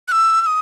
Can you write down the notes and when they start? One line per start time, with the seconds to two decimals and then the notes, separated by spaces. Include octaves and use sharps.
0.08 F#6
0.12 E6
0.41 E6
0.46 D#6